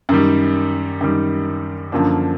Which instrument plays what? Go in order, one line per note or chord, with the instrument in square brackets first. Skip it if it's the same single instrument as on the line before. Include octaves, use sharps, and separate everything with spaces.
[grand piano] F#2 D#3 G3
F#2 D#3 G3
F#2 D3 F3 A#3 D4